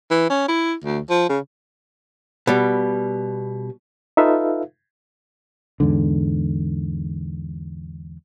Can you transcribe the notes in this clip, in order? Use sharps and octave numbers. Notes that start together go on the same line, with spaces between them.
E3
C#4
E4
D2
F3
C#3
B2 G3
D#4 F4 A4 B4 E5 F5
E2 G#2 D3